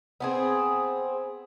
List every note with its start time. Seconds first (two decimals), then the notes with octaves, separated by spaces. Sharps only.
0.20 B3 C4 G#4